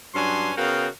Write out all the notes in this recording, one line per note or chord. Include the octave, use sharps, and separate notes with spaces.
G2 F#3 C#4 D4 G#5 C6
C#3 B3 F#4 A#4 F5 G5